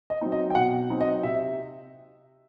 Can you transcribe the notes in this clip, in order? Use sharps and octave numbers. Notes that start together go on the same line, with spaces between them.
D#5
F#3 C4 D#4
D#5
G5
B2 F#5
F#3 C4 D#4
D#5
C3 E5